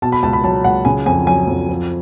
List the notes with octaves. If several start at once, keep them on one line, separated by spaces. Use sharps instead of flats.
B2 A5
B5
C#2 A5
B5
F#3 A5
C#2 F#5
C#3 G#5
F2 G#5
F#3 G#5
F2
F3